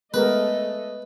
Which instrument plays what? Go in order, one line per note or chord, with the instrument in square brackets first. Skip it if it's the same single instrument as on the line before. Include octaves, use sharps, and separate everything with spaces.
[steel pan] G#3 B3 A#4 [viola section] A3 D#5 [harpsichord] B4